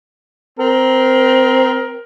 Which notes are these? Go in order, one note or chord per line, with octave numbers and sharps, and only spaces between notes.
C4 A#4